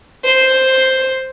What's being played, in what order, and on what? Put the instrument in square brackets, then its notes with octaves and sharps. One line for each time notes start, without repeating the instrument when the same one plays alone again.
[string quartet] C5